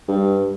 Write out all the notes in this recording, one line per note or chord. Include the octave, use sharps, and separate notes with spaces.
G2